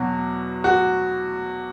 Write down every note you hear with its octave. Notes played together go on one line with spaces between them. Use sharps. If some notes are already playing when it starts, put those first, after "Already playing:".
Already playing: E2 B2 F#3 F#4
F#4